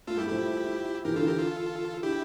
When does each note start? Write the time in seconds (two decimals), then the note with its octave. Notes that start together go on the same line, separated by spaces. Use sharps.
0.07 A3 F4 A4
0.16 G3 E4 G4
0.24 A3
0.29 F3 E4 G4
1.05 E3 G4 A#4
1.13 D3 F4 A4
1.22 E3
1.27 G4 A#4
1.38 F4 A4
2.03 D4 E4 G4